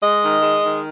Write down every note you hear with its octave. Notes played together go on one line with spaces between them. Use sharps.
G#3 D#5
D#3
G#3
D#3